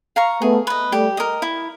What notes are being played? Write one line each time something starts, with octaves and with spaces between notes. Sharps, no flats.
F5 A#5 C#6
A3 B3 G#4
B4 D#5
G3 A3 G4
A#4 D#5
E4